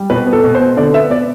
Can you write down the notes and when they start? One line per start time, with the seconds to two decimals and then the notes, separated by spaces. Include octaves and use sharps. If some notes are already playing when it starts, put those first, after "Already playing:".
Already playing: G3
0.10 B2 B4
0.27 B3
0.33 A4
0.44 B2
0.55 C5
0.60 B2
0.77 D3 D5
0.94 B3 E5
1.10 B3 D5